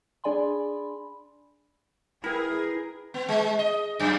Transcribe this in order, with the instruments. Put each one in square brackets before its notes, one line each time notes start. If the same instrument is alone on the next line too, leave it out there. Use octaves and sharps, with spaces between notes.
[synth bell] D4 G#4 D5 G#5 B5 C6
[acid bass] E4 [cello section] G#4 [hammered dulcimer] A#4 B4 G5
[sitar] B3
G#3
D#5
F#2